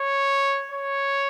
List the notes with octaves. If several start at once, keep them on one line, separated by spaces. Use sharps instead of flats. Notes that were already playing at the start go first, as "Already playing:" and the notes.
Already playing: C#5
C#5